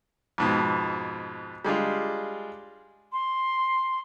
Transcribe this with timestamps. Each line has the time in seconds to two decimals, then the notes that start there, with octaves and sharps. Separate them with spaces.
0.38 F2 G#2 B2
1.65 G3 G#3 D4 F4
3.12 C6